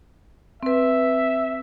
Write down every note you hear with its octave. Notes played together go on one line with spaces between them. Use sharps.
C4 B4 E5